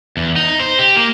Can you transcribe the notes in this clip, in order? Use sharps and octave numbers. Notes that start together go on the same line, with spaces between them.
E2
D#4
C5
G4
A#3